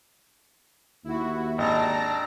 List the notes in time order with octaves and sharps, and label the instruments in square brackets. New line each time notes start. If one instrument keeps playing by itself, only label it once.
[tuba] D#2 [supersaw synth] E4 F#4
[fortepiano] G#1 [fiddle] D4 D5 [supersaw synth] A5 A#5 A#6